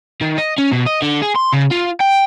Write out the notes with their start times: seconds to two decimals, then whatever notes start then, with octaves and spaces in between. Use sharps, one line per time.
0.21 D#3
0.38 D#5
0.58 C#4
0.72 B2
0.86 D#5
1.02 D3
1.22 G#4
1.36 C6
1.53 C#3
1.72 F4
2.00 G5